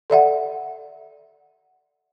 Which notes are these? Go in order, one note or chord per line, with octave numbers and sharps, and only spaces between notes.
A4 D5 E5 F#5